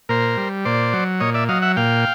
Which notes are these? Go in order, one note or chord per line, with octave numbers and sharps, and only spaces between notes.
A#2 A#4 C5
G3
A#2 C5 D5
F#3
A#2 C#5 D#5
D5 E5
F#3 D#5 F5
E5 F#5
A#2 F5 G5